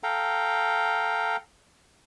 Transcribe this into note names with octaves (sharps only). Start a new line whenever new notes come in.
A4 F5 G5 A#5